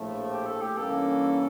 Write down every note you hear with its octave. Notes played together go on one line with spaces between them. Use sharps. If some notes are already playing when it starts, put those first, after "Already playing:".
Already playing: A#1 A2 F3 A3
G4
A4
G4
G2 E3 A#3 C#4 A4